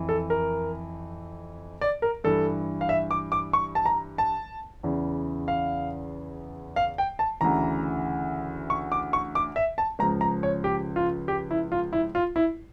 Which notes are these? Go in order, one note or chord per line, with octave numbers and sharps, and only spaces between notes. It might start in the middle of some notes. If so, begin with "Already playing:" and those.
Already playing: F2 E3
A4
A#4
D5
A#4
G2 E3 A4
F5
E5
D6
D6
C#6
A5
A#5
A5
E2 C#3 E3
F5
F5
G5
A5
D2 C#3 E3 A#5
C#6
D6
C#6
D6
E5
A5
C#2 C#3 F3 A#5
A#5
C#5
G4
F4
G4
E4
F4
E4
F4
E4